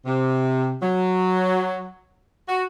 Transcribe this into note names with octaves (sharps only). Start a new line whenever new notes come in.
C3
F#3
F#4